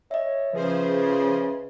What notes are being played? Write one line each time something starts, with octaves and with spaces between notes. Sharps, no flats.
C#5 D#5 E5
C#3 F3 G#4 B4 C5